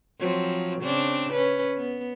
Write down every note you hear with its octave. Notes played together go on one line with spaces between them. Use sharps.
F3 F#3 C4
C#3 C4 D4
C#4 B4
B3